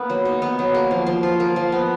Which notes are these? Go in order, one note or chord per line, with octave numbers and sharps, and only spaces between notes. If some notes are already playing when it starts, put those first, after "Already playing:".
Already playing: A#3 B3
F#3
D#4
B3
F#3
A#3
F3
F3
F4
A#3
F3
B3